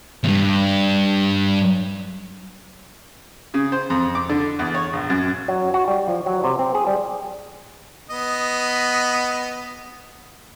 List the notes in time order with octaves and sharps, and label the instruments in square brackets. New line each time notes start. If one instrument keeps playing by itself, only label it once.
[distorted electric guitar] E2 G2
[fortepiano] C#3
C5
F2
D6
D3
E2
C#5
A#1
F#2
[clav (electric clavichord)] F#3
F#4
G3
F3
F#3
C3
C4
G#4
G3
[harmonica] B3 D#5